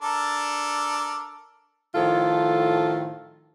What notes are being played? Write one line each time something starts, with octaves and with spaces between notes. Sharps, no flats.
D4 A4 A#4
A2 D#3 F3 F4 A4